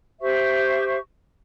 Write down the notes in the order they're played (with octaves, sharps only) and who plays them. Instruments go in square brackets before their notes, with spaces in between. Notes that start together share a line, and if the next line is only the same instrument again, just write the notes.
[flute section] G4 C5 E5 C#6